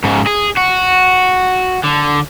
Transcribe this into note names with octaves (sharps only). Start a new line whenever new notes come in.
G#2 C#3
G#4
F#4
D3